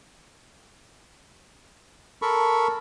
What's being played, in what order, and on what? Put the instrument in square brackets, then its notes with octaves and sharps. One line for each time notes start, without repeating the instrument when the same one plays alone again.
[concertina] A4 A#4 B5 C#6